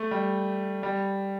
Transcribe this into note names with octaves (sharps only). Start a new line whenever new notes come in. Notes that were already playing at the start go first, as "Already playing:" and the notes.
Already playing: A3
G3
G3